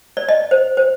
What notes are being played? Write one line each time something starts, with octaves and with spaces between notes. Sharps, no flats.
D5
D#5
C5
C5